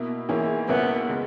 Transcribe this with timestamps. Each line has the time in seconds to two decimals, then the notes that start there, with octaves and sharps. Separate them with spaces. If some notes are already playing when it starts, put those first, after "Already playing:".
Already playing: B2 A#3 E4
0.29 G#2 E3 A#3 C#4 E4
0.69 C#2 B2 A#3 B3 C#4 E4
1.08 C#3 G#3